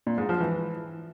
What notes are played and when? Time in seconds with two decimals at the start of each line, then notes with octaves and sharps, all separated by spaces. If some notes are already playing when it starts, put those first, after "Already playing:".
0.07 A#2
0.18 G#2
0.29 F3
0.40 E3